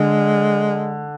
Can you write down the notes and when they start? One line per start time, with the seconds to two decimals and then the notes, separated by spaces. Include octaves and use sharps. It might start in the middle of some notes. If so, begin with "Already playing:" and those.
Already playing: D3 G#3